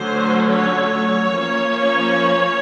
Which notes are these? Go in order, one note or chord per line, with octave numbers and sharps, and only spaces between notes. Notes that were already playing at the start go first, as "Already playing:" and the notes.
Already playing: D3 F#3 A3 C#4 C5
C#5
F3 A#3 C#4